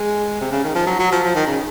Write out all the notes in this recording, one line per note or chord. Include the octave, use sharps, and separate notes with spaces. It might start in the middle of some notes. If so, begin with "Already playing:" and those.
Already playing: G#3
C3
C#3
D#3
F3
F#3
F#3
F3
F3
D#3
C#3